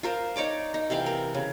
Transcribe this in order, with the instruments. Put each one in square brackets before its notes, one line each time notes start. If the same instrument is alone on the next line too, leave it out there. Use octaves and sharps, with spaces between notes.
[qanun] F4 A#4 C5
D#4 C#5 D5 D6
D#4
C3 E3 F5 G5
A#4
C#3